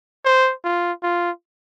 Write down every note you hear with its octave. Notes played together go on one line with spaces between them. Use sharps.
C5
F4
F4